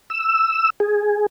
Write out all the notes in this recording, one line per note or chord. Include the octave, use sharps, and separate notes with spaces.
E6
G#4